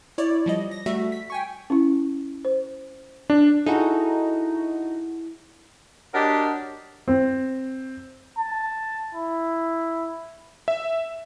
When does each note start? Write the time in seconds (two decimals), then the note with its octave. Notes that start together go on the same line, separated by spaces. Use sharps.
0.18 E4 C#5 D5
0.46 F3 G3 D#5
0.71 A#6
0.86 G3 A3 F#4 E5
1.12 B6
1.30 G5 G#5 C#6
1.70 C#4 E4
2.45 C5
3.30 D4
3.66 D#4 E4 F#4 G#4 A4
6.13 D4 F#4 G4 A#4 C#5 D#5
7.08 C4
8.38 A5
9.14 E4
10.68 E5